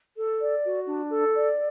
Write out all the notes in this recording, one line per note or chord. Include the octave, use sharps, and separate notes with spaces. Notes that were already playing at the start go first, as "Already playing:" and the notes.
A4
D5
F#4
D4
A4
D5